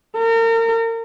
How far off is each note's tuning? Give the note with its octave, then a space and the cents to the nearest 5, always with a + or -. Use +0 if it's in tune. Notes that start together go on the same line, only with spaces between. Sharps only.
A#4 -35